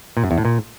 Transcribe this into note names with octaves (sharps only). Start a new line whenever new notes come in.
A#2
F#2
E2
A2
A#2